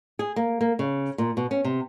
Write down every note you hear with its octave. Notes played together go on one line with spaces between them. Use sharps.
G#4
A#3
A#3
C#3
A#2
B2
C#4
C3